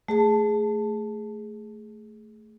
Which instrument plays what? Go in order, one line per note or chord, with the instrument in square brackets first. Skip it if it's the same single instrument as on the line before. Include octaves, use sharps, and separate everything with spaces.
[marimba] A3 G#4 A5